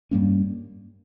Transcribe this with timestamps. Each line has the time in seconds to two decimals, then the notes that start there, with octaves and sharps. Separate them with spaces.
0.11 G2 G3 A#3 C#4